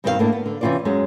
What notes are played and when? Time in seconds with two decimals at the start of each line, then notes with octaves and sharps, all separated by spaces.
0.04 G2 B2 D#3 C4 A4 F5
0.19 A2 A#3 D4 E4
0.33 B3
0.46 D3
0.61 C3 E3 C#4 F4 B4 D5
0.85 F#2 G#3 C#4